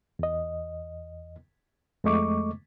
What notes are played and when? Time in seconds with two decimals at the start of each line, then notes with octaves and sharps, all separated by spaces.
0.19 E2 D#5
2.04 F2 G#3 A3 D#5 C#6 D6